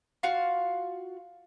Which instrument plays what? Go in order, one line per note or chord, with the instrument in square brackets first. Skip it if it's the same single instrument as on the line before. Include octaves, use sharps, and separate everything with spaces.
[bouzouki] F4 F#4 F5